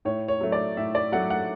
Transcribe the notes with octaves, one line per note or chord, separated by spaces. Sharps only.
A2 C#5
C#5
F#3 A3
D5
A2 E5
D5
F#3 A3 F#5
F#5